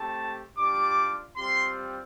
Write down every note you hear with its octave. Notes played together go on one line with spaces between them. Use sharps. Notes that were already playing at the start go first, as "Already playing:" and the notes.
Already playing: A3 C4 G4 A5
G3 D4 F4 D6
G3 C4 F4 C6